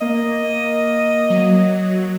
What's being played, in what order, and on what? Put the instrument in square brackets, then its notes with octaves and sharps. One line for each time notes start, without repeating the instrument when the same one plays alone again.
[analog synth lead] A#3 [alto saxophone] D#5
[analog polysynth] F#3